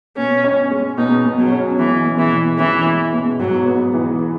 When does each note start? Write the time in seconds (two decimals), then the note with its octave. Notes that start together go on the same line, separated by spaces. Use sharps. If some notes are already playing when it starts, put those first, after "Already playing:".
0.17 B2 C#4
0.44 C#4
0.71 G#3
0.98 B2 D#4
1.25 B2
1.39 F#3
1.52 C#4
1.79 E3 G#3
2.05 B2
2.18 E3
2.33 B2
2.59 E3 C#4
2.86 G#3
3.13 B2
3.39 G#2 F#3
3.66 B3
3.94 E3